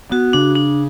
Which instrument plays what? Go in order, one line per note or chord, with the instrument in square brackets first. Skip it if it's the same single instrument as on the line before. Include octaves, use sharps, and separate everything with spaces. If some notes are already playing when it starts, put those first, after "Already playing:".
[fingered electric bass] B3 [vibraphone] F#4
[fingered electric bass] C#3 [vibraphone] D4
[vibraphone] D4